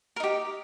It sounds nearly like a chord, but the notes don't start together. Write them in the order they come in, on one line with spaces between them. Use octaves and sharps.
A#4 D#4 G4